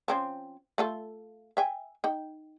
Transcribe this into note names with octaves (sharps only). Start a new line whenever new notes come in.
F3 C4 C#4
A3 F4 A4
E5 G5 G#5
D#4 G5